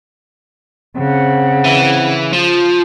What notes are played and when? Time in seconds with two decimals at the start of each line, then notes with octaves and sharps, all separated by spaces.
0.97 C#3 C4 F#5
1.65 E3
2.33 F3